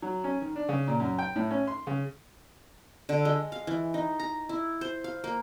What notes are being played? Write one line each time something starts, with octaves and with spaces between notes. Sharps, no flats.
F#3
C#4
D#3
D4
C#3
A#2
F#2
G5
A2
C#4
C6
C#3
D3
G#3
F5
E3
D#4
A#5
E4
C5
F5
A#3